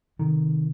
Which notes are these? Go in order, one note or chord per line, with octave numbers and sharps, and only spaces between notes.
C3 D#3